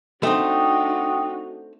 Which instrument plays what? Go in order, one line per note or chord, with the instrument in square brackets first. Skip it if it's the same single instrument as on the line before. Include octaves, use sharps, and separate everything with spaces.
[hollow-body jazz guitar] A3 C4 [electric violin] D4 D#4 [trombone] F#4 [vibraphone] G5 D#6